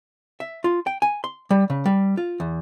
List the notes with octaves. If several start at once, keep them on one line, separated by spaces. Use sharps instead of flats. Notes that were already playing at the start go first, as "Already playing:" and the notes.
E5
F4
G5
G#5
C6
G3
C#3
G3
F4
E2